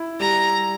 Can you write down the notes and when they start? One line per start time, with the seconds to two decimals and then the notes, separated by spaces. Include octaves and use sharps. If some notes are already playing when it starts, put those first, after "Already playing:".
Already playing: E4
0.20 G3 A#5